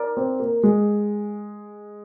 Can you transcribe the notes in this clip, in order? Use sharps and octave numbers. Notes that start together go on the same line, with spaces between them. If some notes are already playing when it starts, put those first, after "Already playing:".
Already playing: A#4 D5
C4
A#3
G#3